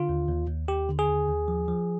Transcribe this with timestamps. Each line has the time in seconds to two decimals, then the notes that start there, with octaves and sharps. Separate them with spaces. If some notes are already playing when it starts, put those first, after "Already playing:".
Already playing: D3 F4
0.09 D#2
0.29 D#2
0.48 D#2
0.68 D#2 G4
0.89 D3
0.99 G#4
1.08 D#2
1.29 D#2
1.48 F3
1.68 F3